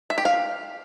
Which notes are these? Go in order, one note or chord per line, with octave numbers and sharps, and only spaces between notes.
E5
G4
F5